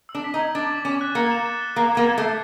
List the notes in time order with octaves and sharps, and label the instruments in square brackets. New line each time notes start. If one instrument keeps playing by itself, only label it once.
[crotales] E6
[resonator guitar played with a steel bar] D4
[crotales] B6
[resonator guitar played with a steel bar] D#4
[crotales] G#6
[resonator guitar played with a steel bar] D4 [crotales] A6
[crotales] D6
[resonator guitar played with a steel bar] C#4 [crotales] D6
[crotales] F#6
[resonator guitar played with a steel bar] A#3 [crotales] C#7
[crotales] E7
A6
G7
[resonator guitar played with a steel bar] A#3 [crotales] C7
[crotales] G#6
[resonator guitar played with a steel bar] A#3
[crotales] G#6
[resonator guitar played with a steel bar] A3
[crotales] C7